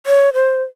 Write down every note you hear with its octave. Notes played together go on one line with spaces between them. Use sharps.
C#5
C5